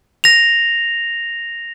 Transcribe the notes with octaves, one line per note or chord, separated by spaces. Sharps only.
A#6 F7